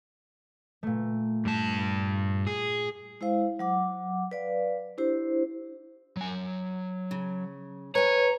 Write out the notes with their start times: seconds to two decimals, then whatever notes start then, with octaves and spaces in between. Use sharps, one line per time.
0.83 A#2 A3
1.45 G2 A5
2.47 G#4
3.21 G#3 E4 C5 F5
3.59 F#3 F#5 D6
4.31 B4 D5 F5
4.98 D4 E4 G4 C5
6.17 F#3 G#5
7.11 C#3
7.95 B4 C#5 G#5 A#5